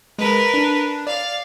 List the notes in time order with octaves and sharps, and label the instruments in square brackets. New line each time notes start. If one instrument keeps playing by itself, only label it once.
[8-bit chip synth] G#3 [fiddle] A#4 B4
[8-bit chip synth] D4
[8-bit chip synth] D5 [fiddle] F5